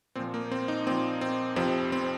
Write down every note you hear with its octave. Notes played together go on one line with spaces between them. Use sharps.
A#2 F3 C4
A#3
C4
D#4
A#2 F3 C4
C4
F2 C3 F3 C4
C4